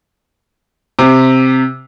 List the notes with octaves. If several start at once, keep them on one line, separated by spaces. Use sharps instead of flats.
C3